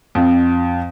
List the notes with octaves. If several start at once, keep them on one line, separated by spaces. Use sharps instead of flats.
F2